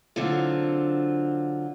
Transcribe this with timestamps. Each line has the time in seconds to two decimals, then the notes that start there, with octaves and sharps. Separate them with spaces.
0.16 D3 F#3 C4 F4